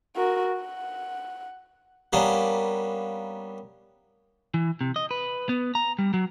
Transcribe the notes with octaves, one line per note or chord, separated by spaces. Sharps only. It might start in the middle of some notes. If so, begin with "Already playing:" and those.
F#4 A#4
F#5
G3 A#3 B3 C#4 D4
E3
C3
D#5
B4
B3
A#5
G3
F#3